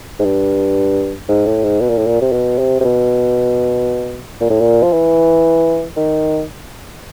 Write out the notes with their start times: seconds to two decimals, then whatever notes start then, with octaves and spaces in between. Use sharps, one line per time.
0.19 G#2
0.25 G2
1.29 G#2
1.46 A2
1.64 G#2
1.81 B2
1.89 A#2
1.98 A2
2.06 A#2
2.21 C3
2.32 B2
2.58 C3
2.81 C3
2.85 B2
4.41 A#2
4.50 A2
4.61 A#2
4.83 F3
4.93 E3
5.97 D#3